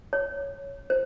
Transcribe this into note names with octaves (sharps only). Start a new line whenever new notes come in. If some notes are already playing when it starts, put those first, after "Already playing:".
C#5
C5